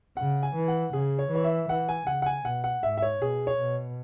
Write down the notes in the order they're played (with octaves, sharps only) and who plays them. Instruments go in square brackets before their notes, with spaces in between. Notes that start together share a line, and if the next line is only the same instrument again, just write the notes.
[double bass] C#3 [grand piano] F#5
[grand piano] G#5
[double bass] E3
[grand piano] F#5
[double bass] C#3 [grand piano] G#4
[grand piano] C#5
[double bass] E3 [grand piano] C#5
[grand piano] E5
[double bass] E3 [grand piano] F#5
[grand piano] G#5
[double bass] C#3 [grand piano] F#5
[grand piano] F#5
G#5
[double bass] B2 [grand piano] F#5
[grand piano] F#5
[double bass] G#2 [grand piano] E5
[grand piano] E5
C#5
[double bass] B2 [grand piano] G#4
[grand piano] C#5
[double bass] B2